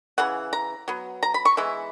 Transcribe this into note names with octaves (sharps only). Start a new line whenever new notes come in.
C#3 E3 F#5
A#5
F#3 B3
A#5
B5
C#6
E3 G#3 B3 E4